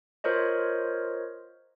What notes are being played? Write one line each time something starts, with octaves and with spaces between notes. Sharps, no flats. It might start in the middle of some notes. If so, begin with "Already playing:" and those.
F4 A#4 C5 C#5 D#5